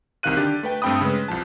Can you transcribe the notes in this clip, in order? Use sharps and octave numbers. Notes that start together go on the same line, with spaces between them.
C2 C3 D#3 F5 F#6 D#7
D3 D4 G4 A6
A3 B4 G5
G2 A3 C4 G5 B5 D#6
C#3 G#3 B4
C2 F3 A5